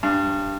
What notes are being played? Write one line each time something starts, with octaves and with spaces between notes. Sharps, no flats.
G2